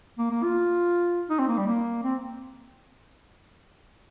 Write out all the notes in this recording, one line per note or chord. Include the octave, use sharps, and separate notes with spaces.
A#3
A#3
F4
D#4
C4
A#3
G3
A#3
C4